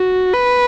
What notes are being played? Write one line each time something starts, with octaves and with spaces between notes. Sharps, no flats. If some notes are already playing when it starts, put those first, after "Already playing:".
Already playing: F#4
B4